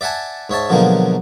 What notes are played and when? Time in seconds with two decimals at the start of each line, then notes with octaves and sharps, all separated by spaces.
0.01 D5 E5 F#5 G#5 A5
0.50 G#2 C#5 E5 A5
0.69 B2 D3 F3 F#3 G#3 A#3